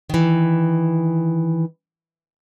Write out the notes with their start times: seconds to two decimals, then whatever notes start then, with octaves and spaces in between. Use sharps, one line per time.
0.10 D#3 E3